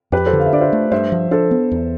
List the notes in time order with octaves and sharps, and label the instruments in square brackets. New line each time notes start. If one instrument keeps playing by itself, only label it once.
[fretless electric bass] F2 [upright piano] G4 B4
[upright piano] A4 C5
[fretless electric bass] D3
[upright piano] F5
E5
[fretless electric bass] D4 [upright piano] D5
[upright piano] C5 E5
[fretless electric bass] A3
[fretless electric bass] G2 [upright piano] C5 E5
[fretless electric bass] F3
[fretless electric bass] D4 [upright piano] A4 C5
[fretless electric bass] B3
E2